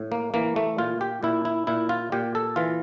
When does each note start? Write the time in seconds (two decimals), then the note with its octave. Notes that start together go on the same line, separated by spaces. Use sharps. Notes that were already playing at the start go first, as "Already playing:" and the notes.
Already playing: A2
0.12 A#3
0.34 E3 A#3
0.56 A3
0.78 A#2 F4
1.01 G4
1.23 A#2 E4
1.45 E4
1.67 A#2 E4
1.89 F4
2.12 A#2 G4
2.35 A4
2.56 E3 F4